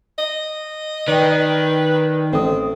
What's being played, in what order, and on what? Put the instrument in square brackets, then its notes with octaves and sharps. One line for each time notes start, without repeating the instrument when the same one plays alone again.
[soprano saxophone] D#5
[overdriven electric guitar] D#3 [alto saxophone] B4 [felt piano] D5 G5
[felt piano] A1 A4 D#6 [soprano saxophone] C4